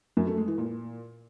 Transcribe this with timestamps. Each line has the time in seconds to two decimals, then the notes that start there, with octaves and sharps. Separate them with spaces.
0.17 F#2
0.27 A3
0.37 G#3
0.48 E3
0.58 A#2